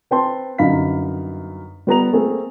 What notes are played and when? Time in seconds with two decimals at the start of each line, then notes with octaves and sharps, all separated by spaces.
0.11 C4 B4 G5 A5 C6
0.58 G1 F#2 D#4 F5 B5 B6
1.87 G3 B3 A#5 F7
2.13 A3 A#3 C4 G#4